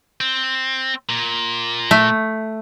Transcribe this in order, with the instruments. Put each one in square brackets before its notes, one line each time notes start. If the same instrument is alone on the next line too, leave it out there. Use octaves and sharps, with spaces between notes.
[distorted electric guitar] C4
A#2
[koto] A3